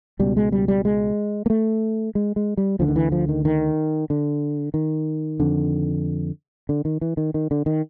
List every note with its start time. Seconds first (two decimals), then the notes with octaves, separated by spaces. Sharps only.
0.19 C#2 B2 G3
0.37 G#3
0.52 G3
0.68 G3
0.85 G#3
1.46 A#3
1.50 A3
2.15 G#3
2.36 G#3
2.57 G3
2.79 D2 D3 F3
2.88 D#3
2.96 E3
3.12 F3
3.29 D#3
3.45 D#3
4.10 D3
4.74 D#3
5.40 F2 D3
6.69 D3
6.85 D#3
7.01 E3
7.17 D#3
7.34 D#3
7.51 D3
7.66 D#3